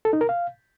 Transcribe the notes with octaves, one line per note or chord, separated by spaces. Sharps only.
A4
D#4
A#4
F5